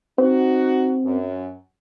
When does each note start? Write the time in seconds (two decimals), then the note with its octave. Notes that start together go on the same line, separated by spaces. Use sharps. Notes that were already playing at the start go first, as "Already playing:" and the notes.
0.18 C4 D#4 F#4
1.05 F#2